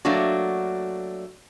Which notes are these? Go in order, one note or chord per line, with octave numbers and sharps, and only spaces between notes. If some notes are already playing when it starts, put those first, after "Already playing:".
F#3 A3 A#3 D4 F#4